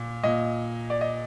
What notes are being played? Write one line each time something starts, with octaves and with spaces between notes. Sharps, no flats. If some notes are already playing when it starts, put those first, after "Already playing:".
Already playing: A#2
A#2 D#5
D5
D#5